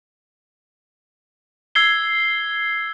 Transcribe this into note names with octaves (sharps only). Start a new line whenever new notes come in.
E6 G#6 C7 G7